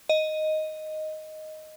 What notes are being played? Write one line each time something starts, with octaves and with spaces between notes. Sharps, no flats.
D#5